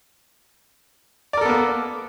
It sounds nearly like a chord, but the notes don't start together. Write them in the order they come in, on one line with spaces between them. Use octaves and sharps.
D5 A#4 A4 B3 A#3